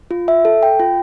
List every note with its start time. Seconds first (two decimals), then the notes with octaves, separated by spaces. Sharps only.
0.11 F4
0.28 E5
0.45 A4
0.63 G5
0.80 F4